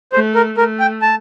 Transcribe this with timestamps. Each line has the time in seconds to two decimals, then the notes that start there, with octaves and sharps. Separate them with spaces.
0.13 A3 C5
0.35 A#4
0.57 A3 A#4
0.80 G5
1.02 A5